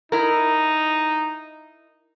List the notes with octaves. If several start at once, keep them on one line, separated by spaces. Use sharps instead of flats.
D#4 E4 A#4